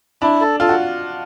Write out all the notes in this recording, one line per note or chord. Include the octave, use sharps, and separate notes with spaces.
D4 E4
A4
F4 A4
F#4